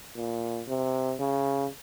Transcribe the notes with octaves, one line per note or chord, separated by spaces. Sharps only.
A#2
C3
C#3